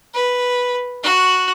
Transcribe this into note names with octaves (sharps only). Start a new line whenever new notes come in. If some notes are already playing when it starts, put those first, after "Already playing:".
B4
F#4 F#6